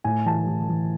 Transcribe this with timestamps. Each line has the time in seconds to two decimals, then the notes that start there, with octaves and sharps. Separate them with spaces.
0.04 A2 G#5
0.26 E3 A5
0.47 E3
0.69 E3